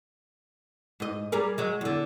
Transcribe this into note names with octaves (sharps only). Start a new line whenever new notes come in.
G#2 D#5
G3 G#4 A#4
F#3 G#3
E2 D3